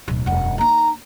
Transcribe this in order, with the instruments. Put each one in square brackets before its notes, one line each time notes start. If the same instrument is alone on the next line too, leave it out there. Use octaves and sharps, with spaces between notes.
[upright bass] D1 B1
[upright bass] E1 F#2 [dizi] F#5
[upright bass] A#3 D#4 [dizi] A#5